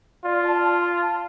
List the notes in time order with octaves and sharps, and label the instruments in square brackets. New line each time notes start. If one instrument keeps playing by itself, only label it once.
[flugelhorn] F4 [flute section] D5
[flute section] A5
C6
C6
A5